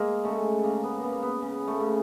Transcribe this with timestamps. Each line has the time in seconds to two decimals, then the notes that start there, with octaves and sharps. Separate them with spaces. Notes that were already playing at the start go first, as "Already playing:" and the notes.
Already playing: G#3 A#3
0.25 C#3 A3
0.64 C#3 A#3
0.83 B3
0.98 C#3 A#3 B3
1.13 A#3
1.23 B3
1.42 C#3
1.67 A3
1.80 C#3